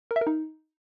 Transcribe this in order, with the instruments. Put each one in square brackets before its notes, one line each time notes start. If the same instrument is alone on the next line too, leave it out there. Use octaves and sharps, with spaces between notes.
[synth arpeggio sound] A#4
E5
A#4
D#4